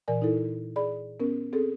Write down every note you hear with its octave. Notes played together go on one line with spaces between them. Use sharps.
A#2 E3 A#4 D5 G#5
D#4 E4 A4
G#4 D5 B5
B3 C#4 A#4
C4 G#4 A4